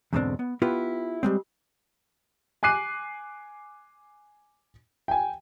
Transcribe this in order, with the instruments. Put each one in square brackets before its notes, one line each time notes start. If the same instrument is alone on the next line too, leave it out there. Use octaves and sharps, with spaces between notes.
[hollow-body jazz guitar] E2 G#2 B2 D3 C4 D4
B3
B3 E4 F4 G4 B4
G3 G#3 C4
[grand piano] G#5 D6 F#6 C7 D#7
G5 G#5